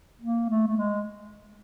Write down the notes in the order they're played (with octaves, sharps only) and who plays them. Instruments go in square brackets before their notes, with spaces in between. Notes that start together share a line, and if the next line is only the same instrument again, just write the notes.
[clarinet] A#3
A3
A3
G#3